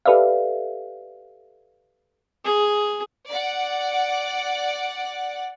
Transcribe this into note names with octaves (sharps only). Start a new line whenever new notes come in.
G4 A4 B4 D5 E5 F5
G#4
D5 F#5